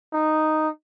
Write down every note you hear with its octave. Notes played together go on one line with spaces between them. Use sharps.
D#4